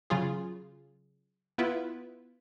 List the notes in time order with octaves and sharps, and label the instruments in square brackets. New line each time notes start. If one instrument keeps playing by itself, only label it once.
[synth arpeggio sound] C#3 F#3 F4 G#4
B3 E4 F4 B4